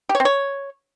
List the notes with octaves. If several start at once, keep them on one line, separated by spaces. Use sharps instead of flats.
G4
C#5
C4
C#5